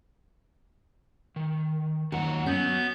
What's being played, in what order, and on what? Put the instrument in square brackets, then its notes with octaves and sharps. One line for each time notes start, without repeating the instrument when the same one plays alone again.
[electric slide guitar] D#3
[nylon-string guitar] D#2 [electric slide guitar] F#3 F4 F#5
[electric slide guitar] F#3 [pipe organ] B3 G6 [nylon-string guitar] C#4